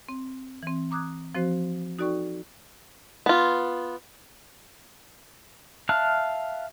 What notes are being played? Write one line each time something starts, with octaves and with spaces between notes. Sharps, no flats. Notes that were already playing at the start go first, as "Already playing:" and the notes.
C4
E3 C4
A#5 D6 D#6 F#6 G#6
F3 C4 F#4 C5
D#4 F#4 A4 D5 G5 C#6
B3 F4
E5 F5 A5 F6 F#6